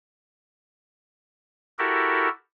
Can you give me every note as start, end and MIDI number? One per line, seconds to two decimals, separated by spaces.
1.79 2.29 64
1.79 2.29 66
1.79 2.29 67
1.79 2.29 69
1.79 2.29 70